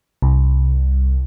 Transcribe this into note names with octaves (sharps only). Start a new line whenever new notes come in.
C2